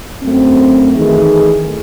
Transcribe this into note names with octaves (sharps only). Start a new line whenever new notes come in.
F#2 A3 C4
D#3 E3 A3 D#4 G#4